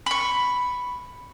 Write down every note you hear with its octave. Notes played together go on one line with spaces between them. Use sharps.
B5 C#6